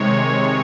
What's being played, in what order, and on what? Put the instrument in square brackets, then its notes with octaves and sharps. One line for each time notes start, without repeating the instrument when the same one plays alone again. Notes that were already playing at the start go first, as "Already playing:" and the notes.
Already playing: [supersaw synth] C3 D#3 G#3 C#5